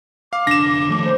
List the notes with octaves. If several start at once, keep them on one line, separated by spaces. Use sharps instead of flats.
F5 D6
F1 D3 D4 A#6 E7
D#3 F3 A3
C5